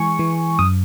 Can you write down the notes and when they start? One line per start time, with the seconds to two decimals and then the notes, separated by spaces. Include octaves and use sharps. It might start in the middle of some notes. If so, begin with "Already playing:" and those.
Already playing: E3 G#3 G#5 C#6
0.19 E3
0.59 F#2 D#6